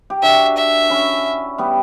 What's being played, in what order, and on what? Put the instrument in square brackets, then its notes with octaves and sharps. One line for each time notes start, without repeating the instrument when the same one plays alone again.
[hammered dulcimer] G4
[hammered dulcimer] D4 F#4 [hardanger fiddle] E5
[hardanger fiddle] E5
[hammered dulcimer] C#4 E4
G3 B3